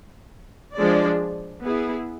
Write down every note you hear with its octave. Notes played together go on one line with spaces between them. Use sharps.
F3 G#3 D4 G#4 D5
B3 E4 G#4